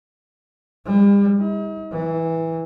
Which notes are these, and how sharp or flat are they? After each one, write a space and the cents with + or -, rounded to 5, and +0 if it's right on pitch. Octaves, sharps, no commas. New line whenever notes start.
G3 +45
D#4 +45
E3 -10